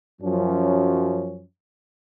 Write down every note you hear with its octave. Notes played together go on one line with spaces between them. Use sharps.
F#2 F3 F#3 C#4